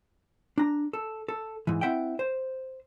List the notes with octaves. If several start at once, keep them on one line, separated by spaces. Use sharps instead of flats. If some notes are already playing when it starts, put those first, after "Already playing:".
D4 A#5
A4
A4
G#2 E3
C4 E4 E5 F#5 G5
C5